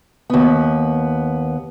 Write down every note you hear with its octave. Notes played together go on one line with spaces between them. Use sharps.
D#2 B3